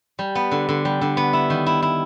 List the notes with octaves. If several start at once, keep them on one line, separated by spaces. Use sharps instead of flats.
G3
B3
D3
D3
G3
D3
B3
E4
D#3
E4
E4